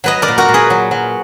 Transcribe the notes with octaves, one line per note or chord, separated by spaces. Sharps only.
F#3 B4 D#5
A#4 D5
A#2
F#4 A#4
A#2
G#4 B4
F#3
F#3